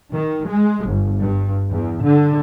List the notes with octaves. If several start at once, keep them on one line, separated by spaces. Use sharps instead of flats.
D#3
G#3
G1
G2
E2
D3